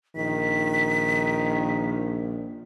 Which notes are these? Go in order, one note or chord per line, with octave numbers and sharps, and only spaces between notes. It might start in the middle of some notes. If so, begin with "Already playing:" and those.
A#1 D#3 B6